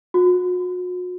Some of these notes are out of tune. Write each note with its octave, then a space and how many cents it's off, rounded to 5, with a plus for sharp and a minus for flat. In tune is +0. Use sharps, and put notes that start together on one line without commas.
F#4 -40